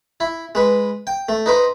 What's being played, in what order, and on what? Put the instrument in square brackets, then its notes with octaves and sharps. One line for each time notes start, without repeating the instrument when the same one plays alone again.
[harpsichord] E4
G#3 B4
G5
A3
D#4 B4 C5